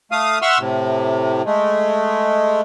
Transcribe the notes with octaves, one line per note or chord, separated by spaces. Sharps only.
A3 F5 D#6
E5 F#5 C6 C#6 E6 F6
A2 C3
G#3 A3